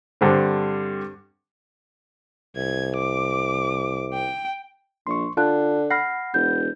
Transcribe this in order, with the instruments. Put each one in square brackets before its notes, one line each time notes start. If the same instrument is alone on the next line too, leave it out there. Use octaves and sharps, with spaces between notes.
[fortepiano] G2 D3 C4
[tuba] C2 [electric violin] G#6
[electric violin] D6
G5
[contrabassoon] A#1 [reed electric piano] C6 C#6
[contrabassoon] D3 [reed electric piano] F4 [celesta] A5 F#6
[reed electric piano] F#5 B5 [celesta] F6 A#6 C7
[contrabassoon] E1 [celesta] G6